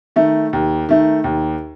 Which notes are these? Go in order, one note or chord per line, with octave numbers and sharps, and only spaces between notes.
D#3 A3
D#2
D#3 A3
D#2